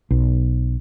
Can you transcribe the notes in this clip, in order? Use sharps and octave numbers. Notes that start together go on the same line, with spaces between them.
B1